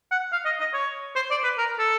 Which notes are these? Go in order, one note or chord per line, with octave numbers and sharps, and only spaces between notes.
F#5
F5
D#5
D#5
C#5
C5
D5
B4
A#4
A4